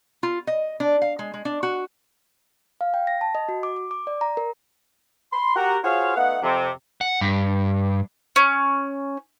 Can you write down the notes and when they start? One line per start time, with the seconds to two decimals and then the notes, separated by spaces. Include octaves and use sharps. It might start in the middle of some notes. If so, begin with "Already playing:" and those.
0.23 F4
0.47 D#5
0.80 D4
1.02 F5
1.19 G#3
1.34 G#3
1.45 D4
1.63 F#4
2.81 F5
2.94 G5
3.07 A#6
3.21 A5
3.35 D#5
3.49 F#4
3.63 D6
3.76 D6
3.91 D6
4.07 D5
4.21 A#5
4.37 A#4
5.33 B5 C6
5.56 F#4 G4 A#4 F#5
5.84 F4 F#4 G#4 C5 C#5 F5
6.17 A3 B3 D#4 F5 F#5
6.43 F2 C3
7.01 F#5
7.21 G2
8.36 C#4